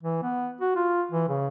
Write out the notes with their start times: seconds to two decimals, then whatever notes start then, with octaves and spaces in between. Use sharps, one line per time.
0.03 E3
0.22 B3
0.61 F#4
0.76 F4
1.12 E3
1.29 C#3